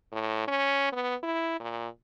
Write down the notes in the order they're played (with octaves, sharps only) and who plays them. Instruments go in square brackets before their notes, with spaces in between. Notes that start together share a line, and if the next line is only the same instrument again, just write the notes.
[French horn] A2
C#4
B3
E4
A#2